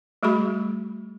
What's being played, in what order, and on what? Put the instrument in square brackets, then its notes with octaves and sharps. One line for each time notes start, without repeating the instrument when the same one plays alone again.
[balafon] G3 A3 F#4 G#4 B5